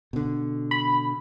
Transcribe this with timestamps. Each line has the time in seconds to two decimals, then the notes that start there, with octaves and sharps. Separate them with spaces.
0.13 B2 D3
0.71 B5